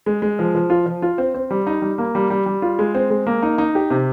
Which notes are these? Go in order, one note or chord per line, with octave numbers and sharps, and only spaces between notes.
G#3
G#3
F3
F3
F4
F3
F4
C4
C4
G3
D#4
G3
A#3
G3
G3
G3
F4
G#3
C4
G#3
A#3
D#4
D#4
G4
C3